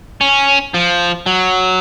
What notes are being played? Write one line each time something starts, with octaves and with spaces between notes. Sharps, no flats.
C#4
F3
F#3